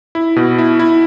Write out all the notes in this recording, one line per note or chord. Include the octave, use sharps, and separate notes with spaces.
E4
B2
E4
E4